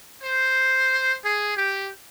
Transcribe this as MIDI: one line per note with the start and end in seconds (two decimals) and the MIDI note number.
0.24 1.17 72
1.24 1.52 68
1.56 1.89 67